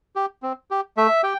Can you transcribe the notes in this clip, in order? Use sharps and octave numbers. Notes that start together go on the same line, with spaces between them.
G4
C4
G4
A3 E5
G4 G5